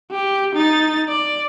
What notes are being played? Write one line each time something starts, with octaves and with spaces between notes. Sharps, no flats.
G4
D#4 A6
D5